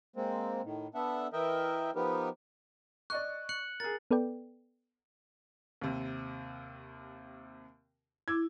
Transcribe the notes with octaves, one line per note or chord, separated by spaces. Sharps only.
G#3 A#3 C4
A2 D#3
B3 D4 A4 E5 F#5
E3 A#4 D#5 E5 G5
F3 B3 D#4 G4 A#4 B4
D5 D#5 C#6 F#6
F#6 C#7 F#7
G#4 A#4 A6
B3 A4 B4 D5 G5
D#2 C3
E4 D6 E6 G#6